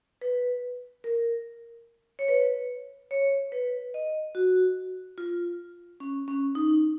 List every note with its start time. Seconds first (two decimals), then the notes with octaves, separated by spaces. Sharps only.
0.21 B4
1.04 A#4
2.19 C#5
2.28 B4
3.11 C#5
3.52 B4
3.94 D#5
4.35 F#4
5.18 F4
6.00 C#4
6.28 C#4
6.55 D#4